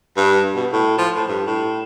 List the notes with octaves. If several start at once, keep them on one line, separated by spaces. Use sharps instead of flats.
G2
B2
A2
F3
A2
G2
A2